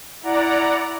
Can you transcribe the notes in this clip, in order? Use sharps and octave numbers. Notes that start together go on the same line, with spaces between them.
E4 D5 F#5 A#5